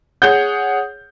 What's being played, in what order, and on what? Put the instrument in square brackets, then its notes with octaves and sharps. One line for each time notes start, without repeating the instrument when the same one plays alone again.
[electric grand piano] G#4 C#5 F#5 [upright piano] G6